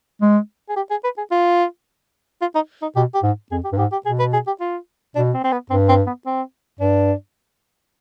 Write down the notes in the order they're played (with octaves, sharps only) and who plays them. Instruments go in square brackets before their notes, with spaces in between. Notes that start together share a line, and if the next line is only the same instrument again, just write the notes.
[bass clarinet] G#3
[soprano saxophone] G#4
G4
G#4
B4
G#4
F4
F4
D#4
D#4
[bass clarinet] B2 [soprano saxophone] G4
[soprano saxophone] G4
[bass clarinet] G#2
[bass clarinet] F2 [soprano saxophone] G#4
[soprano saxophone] G4
[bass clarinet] G2
[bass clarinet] G#2 [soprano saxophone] G4
[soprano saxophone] G4
[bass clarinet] B2 [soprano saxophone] G#4
[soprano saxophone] B4
G#4
G4
F4
[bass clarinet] B2 [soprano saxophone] D4
[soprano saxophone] C4
C4
B3
[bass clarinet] G2 [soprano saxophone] C4
[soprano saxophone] C4
B3
C4
[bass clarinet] G2 [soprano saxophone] D4